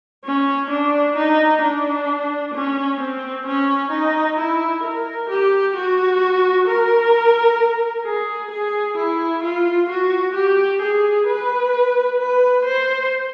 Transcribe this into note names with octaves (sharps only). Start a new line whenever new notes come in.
C#4
D4
D#4
D4
C#4
C4
C#4
D#4
E4
A#4
G4
F#4
A#4
G#4
G#4
E4
F4
F#4
G4
G#4
B4
B4
C5